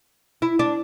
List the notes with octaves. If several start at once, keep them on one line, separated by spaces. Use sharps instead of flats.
E4
D4